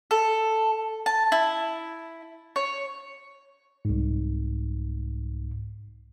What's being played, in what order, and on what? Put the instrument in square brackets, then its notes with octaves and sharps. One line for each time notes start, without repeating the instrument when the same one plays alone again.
[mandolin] A4
A5
E4
C#5
[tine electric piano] C2 G#2